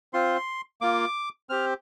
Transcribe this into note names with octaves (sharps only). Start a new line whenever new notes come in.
C4 F4 C6
A#3 F4 D6
C4 G4 F6